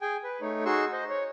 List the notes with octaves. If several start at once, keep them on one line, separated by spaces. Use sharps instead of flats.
G#4 G5 G#5
B4
A3 D#4 C#5
D#4 F#4 G#4 C6 C#6 E6
C5 D#5
C#5